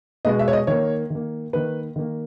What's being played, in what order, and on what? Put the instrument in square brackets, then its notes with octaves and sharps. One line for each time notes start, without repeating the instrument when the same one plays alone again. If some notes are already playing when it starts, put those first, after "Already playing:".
[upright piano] B2 G#3 B3 D#5
E5
C#5
D#5
D#3 A#3 C#5
D#3 A#3
D#3 A#3 B4
D#3 A#3